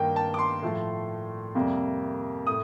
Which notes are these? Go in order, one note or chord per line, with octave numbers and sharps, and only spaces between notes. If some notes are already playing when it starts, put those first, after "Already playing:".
Already playing: G2 D#3 A#3 G5
A5
D6
C6
A2 F3 A3
F2 C3 G3 A#3
A2 D#6